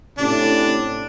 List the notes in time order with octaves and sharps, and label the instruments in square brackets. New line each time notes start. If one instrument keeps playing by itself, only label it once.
[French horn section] A2 C3 C#4 [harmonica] D4